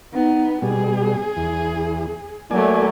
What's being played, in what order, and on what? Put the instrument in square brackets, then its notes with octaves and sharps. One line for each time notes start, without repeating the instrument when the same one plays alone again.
[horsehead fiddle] B3 D#4
[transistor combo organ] B2 G3 [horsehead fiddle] G#4
[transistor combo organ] E2
[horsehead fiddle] F#3 A3 [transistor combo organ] A#3 D5 G#5